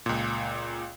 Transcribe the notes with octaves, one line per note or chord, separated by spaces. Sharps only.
C#2 A#2